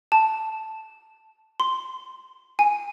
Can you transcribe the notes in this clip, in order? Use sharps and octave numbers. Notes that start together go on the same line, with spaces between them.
A5
C6
G#5